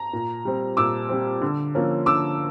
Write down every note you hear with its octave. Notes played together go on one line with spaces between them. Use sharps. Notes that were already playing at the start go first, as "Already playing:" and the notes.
Already playing: A#5
A#2
G3 C4
A#2 D6 E6
G3 C4
D3
F3 A#3 C#4
D3 D6 E6